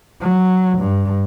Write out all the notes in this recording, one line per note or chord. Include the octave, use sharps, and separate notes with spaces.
F#3
G2